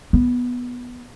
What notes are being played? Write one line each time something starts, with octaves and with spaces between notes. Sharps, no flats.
B3